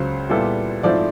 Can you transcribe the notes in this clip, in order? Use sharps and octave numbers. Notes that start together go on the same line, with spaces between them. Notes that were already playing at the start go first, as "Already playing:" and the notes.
Already playing: C#2 C#3 F#3 C5
A#2 G3 B3 E4 A4
G#2 F3 A3 C4 E4 D5